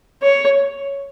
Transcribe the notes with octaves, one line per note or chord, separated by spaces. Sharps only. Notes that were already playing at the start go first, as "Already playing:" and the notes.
C#5